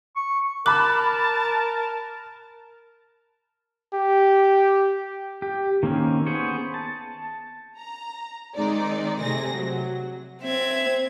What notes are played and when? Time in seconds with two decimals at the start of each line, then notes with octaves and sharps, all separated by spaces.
0.16 C#6
0.66 A#4 A5 B5 D6 F#6
3.94 G4
5.42 G4
5.83 D#3 A#3 C4 C#4
6.27 B3 G#4 C5 C#5
6.74 A5
7.78 A#5
8.56 D#3 G#3 C4 D#4 D5
9.21 C3 A3 G#4 A#6
9.54 F#3
10.43 C4 E5 G#6